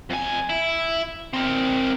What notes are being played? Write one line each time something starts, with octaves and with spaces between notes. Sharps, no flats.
F2 G#5
E4
C4 A#4